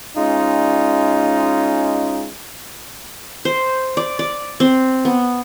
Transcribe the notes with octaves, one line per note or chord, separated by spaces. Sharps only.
G#3 C#4 D#4 F4
C5
D5
D5
C4
B3